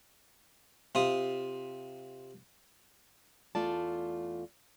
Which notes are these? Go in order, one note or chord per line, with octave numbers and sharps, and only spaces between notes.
C3 F4 D#6
E2 A3 F4 D5 A5